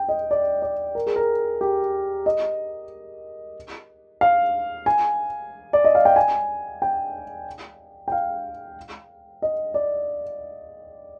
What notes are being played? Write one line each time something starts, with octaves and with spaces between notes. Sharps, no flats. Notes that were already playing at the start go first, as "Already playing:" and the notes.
Already playing: G5
D#5
D5
D5
A#4
G#4
A#4
G4
D#5
F5
G#5
D5
D#5
F5
G5
G#5
G5
G5
F5
D#5
D5